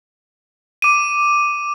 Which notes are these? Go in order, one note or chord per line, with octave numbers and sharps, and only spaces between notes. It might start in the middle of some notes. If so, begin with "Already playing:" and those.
D6 D#7